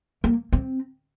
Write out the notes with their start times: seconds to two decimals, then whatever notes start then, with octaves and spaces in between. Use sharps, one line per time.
0.24 A#3
0.53 C4